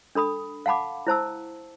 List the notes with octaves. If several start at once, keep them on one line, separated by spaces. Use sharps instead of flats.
D4 A4 B5 D#6
F5 F#5 A5 B5 D6
E4 C5 A5 E6